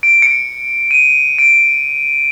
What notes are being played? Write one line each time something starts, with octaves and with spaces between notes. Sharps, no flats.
D7
C#7
D#7
D7